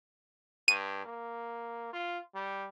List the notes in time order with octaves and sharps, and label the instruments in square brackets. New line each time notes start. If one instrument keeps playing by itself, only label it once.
[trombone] G2 [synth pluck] D#7
[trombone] A#3
F4
G3